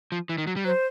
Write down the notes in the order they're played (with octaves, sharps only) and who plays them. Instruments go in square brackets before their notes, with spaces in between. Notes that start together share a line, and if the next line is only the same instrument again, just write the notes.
[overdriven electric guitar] F3
E3
D#3
F#3
G3
[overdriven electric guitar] F#3 [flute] C5